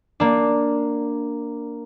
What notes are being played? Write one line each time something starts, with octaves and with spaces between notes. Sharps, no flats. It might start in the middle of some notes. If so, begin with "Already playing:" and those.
A#3 D4